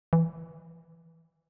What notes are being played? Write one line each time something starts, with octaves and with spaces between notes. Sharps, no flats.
E3